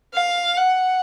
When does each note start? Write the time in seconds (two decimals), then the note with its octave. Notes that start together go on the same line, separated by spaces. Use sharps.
0.14 F5
0.57 F#5